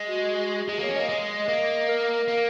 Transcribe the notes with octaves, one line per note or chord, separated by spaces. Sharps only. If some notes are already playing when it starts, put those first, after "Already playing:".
Already playing: G#3
F#4
G#3 G#4
A#3 C#5
C#4
A#3 D#5
G#3
A#3
A#4
A#3